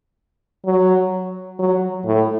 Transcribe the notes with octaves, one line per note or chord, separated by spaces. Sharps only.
F#3
F#3
A2